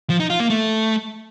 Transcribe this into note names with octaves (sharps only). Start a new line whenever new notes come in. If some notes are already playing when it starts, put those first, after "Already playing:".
F3
D#4
F4
A#3
A3